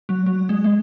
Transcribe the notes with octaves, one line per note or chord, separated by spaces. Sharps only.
F#3
F#3
G#3
G#3